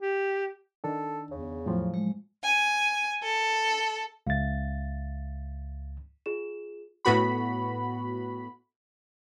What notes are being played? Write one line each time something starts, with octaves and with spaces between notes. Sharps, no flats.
G4
D#3 D4 A4
E2 C#3
A2 F3 F#3
G#3
G#5
A4
C#2 E5 F5 A6
F4 G#4 E7
A2 B3 F#4 B5